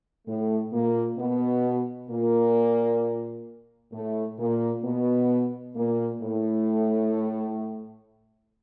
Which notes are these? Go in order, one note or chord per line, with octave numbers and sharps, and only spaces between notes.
A2 A3
A#2 A#3
B2 B3
A#2 A#3
A2 A3
A#2 A#3
B2 B3
A#2 A#3
A2 A3